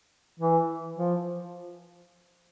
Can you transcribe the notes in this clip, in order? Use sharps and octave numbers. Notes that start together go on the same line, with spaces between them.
E3
F3